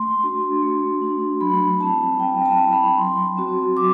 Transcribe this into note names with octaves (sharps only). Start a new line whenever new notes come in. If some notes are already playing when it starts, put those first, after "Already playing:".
Already playing: A3 C6
D4 F#4
A3
D4 F#4
F#3 B5
C4 E4 A5
F#3 G5
A5
C4 E4
B5
F#3 C6
C4 F#4
F#3 D6